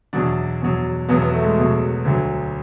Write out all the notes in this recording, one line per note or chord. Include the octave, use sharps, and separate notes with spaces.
E2 B2 F#3 D4
E2 B2 F#3
E2 B2 F#3 B3
B3
A3
G#3
E2 B2 F#3
D2 D3 F#3